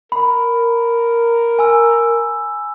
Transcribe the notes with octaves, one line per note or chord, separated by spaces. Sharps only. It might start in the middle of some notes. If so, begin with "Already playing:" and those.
A#4 B5
G#5 E6